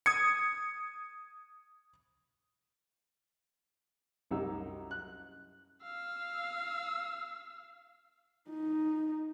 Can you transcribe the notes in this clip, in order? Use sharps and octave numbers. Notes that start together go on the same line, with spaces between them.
D#6 G#6 C#7
C2 F#2 D#4 G4 E6
F#6
F5 E6
D#4